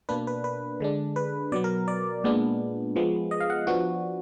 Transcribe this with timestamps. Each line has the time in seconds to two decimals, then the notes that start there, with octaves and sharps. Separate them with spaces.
0.09 B2 A#3 D4 B4
0.27 B4
0.44 B4
0.80 D3 G#3 D4
1.16 B4
1.52 B2 F#3 B3 D5
1.64 A#4
1.88 D5
2.24 A#2 G#3 B3 D4
2.96 F3 G#3 B3
3.31 D#5
3.40 F5
3.50 F#5
3.67 F3 B3 D4 F#4